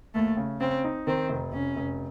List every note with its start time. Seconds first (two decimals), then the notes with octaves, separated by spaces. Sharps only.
0.14 D#2 A3
0.37 C#3
0.60 C#3 C4
0.84 D#4
1.07 D#3 C4
1.29 F1
1.52 F1 C#4
1.76 F1